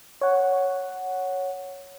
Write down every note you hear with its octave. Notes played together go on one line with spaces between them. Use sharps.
C#5 F#5